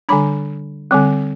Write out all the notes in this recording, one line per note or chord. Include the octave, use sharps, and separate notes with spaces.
D3 G3 D4 B5
D3 G3 C4